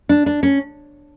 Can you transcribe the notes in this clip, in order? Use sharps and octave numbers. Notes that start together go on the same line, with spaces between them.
D4
D4
C#4